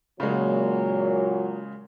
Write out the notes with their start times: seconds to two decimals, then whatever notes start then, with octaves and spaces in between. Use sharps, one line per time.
0.20 A#2 C#3 F#3 G#3